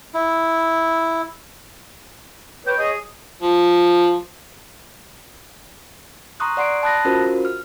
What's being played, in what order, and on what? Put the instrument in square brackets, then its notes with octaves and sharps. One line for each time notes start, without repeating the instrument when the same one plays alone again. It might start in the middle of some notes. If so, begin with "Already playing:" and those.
[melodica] E4
[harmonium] B4 C#5 [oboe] G5
[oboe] G#4 [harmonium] C#5 D#5
[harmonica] F3
[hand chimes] A#5 C6 C#6 D#6 F#6
D5 F#5 C6 C7 D7
A5 B5 D#6 F#6 A6 A#6
C#4 F4 F#4 A#4 C5
F6